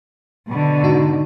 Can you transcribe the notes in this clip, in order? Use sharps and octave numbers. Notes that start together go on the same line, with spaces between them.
B2 D3
G#2 D#4 F#4